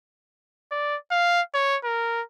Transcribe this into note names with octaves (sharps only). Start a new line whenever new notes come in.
D5
F5
C#5
A#4